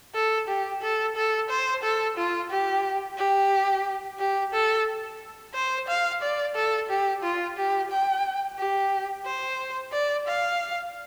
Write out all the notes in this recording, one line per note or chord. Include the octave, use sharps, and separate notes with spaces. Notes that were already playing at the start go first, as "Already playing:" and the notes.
A4
G4
A4
A4
C5
A4
F4
G4
G4
G4
A4
C5
F5
D5
A4
G4
F4
G4
G5
G4
C5
D5
F5